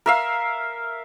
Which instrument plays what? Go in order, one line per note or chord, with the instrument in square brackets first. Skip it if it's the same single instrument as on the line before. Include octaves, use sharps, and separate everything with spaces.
[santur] A#4 E5 F5